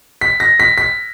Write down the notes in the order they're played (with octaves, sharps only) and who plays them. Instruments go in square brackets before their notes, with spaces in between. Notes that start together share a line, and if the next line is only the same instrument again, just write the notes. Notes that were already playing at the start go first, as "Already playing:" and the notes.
[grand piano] B6
A#6
B6
B6